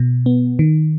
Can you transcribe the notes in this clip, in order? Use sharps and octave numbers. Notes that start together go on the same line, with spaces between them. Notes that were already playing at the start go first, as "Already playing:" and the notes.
Already playing: B2
B3
D#3